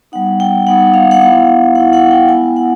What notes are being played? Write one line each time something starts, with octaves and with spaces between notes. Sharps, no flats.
G3 B3 D#4 F#5
G5
G3 B3 D#4 F#5
F5
F#5
B3 E4 F5
B3 E4 F#5
F#5
G5
G#3 B3 E4 G#5
F#5